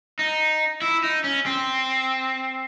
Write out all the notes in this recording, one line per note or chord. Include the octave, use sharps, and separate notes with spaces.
D#4
E4
D#4
C#4
C4